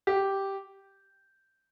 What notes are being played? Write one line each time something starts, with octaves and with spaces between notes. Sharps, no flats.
G4